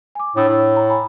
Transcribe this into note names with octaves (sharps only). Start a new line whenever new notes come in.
G#5 D6
A2 D4 D#6 E6
A2
A#5
G#5 A#5 B5